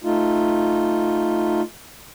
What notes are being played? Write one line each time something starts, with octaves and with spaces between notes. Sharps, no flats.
A3 D#4 F4